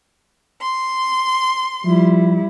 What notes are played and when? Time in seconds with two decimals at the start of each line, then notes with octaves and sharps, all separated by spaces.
0.61 C6
1.85 F3 G3 E4